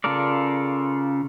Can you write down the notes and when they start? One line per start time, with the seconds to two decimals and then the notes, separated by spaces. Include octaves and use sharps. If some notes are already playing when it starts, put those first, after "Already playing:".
0.04 C#3 F4 A4 A#4 D5